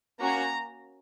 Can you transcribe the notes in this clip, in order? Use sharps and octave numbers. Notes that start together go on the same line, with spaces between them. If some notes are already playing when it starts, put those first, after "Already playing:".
A#3 C#4 F#4 A#5